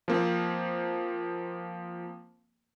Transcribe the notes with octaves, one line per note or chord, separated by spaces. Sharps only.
F3 A#3 C4